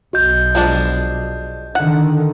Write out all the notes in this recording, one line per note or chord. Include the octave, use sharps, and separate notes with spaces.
B1 B2 F#4 D#5 G6
F3 G#3 D4
D3 D#3 F#5